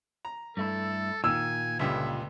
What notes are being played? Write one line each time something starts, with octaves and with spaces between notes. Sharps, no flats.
A#5
G2 A3 E4 A4
A#2 D#3 G#5 E6
C#2 G2 D3 E5